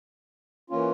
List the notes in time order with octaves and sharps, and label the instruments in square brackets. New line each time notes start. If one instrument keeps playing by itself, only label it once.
[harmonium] E3 A#3 C#4 F4